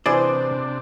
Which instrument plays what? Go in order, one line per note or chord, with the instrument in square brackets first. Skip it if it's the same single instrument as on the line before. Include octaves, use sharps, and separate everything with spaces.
[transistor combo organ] C3 D4 [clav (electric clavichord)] E3 G#4 D5 [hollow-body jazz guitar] C5